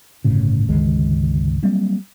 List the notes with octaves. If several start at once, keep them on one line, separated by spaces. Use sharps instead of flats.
G1 A2 C#3
G1 C#2 D#3 G#3
F#3 G3 A#3 C4